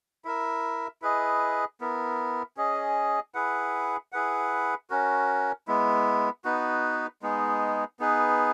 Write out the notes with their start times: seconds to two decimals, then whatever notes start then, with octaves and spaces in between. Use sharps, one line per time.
0.25 E4 A#4 E5
1.02 E4 G#4 B4 D#5
1.81 B3 E4 A#4
2.57 C#4 G#4 D#5
3.34 E4 G#4 B4 F#5
4.12 E4 G#4 B4 F#5
4.90 C#4 F#4 A#4
5.68 G#3 B3 E4
6.44 B3 D#4 F#4 B4
7.22 G#3 B3 D#4 G#4
8.00 B3 D#4 G#4 B4